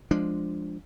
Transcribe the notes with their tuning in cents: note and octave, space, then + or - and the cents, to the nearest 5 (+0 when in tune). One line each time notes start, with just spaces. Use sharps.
F3 +0 G#3 +0 D4 +0